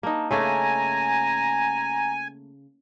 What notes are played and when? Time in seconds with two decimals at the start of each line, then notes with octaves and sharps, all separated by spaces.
0.03 A#3 D#4 A5
0.31 C#3 A3 A#3 G#5 A#5